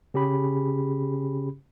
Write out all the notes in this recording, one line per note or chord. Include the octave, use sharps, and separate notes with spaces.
C#3 C#4 G4 G#4 B5